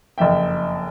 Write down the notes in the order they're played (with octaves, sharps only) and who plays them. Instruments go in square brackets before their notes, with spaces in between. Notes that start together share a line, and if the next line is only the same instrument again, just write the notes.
[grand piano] F#1 F2 E5 G5